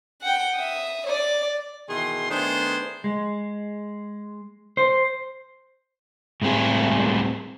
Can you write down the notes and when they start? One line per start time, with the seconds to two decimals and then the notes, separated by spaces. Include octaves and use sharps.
0.22 F#5 G5
0.56 E5 D#6
1.07 D5
1.88 B2 D#3 E3 G#4 C6
2.30 D#3 A3 B3 D4 G#4 C5
3.04 G#3
4.77 C5
6.42 A2 G3 G#3 C4 G#4